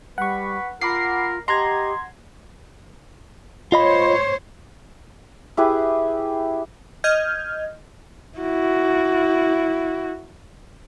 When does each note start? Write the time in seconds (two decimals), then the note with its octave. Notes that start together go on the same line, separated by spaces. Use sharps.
0.18 G3 B4 F#5 C#6
0.81 F4 A#4 F#5 B5 D6 C7
1.48 G4 D#5 F#5 A#5 C6 G#6
3.72 F4 C5 C#5 D#5 B5
5.57 E4 G4 G#4 B4
7.04 D#5 F6 G6 G#6
8.39 E4 F#4